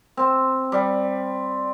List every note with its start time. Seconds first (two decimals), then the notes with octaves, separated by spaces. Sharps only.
0.17 C4
0.72 G3